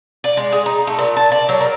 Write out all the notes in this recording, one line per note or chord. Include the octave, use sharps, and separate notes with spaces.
D5
G#3
G#4
D#4
A3
A#2
A5
D5
F#3
A#4